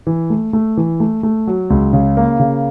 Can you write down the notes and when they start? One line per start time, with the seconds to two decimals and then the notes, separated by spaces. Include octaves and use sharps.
0.07 E3
0.30 A3
0.53 A3
0.77 E3
1.00 A3
1.23 A3
1.47 F#3
1.70 C#2
1.93 C#3
2.17 A#3
2.39 C#3